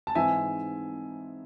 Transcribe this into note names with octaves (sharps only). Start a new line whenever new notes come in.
A5
G#2 E3 C4 D#4 E5 G#5